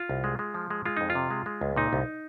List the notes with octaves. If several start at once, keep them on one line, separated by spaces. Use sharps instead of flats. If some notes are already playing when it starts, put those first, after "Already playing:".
Already playing: F4
C2
G#3
G#3
F3
G#3
G#3 F4
F2 D#4
F4
C3
G#3
G#3
C#2
A#2 D#4
C2